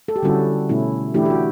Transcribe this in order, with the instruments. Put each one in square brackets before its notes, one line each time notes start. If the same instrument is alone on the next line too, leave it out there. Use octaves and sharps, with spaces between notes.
[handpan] A4
G4
D3 G3 C#4 E4 F#4 A4
B2 A3 C#4 E4
E3 A3 D4 E4 G4
G4
F#4